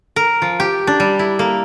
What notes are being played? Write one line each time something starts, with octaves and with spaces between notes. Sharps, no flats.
A#4
F3
G4
D4
G3
E4
A#3